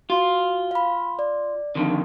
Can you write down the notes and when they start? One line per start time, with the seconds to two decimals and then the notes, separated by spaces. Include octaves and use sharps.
0.10 F4 F#4
0.71 F5 B5
1.19 D5
1.75 F2 D3 D#3